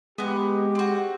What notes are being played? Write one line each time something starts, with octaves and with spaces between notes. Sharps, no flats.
G#3 B3 D#4 G4
C4 F#4